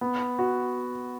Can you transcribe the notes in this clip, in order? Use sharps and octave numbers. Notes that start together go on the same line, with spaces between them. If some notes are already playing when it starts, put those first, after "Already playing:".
B3
F#4